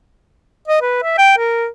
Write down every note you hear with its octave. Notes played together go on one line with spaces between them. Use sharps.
D#5
B4
E5
G5
A#4